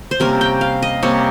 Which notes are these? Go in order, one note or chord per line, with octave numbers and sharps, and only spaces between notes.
C5
C3 G3 A#3 C#4 A#4
G5
F5
D#5
C3 G3 A#3 C#4 C#5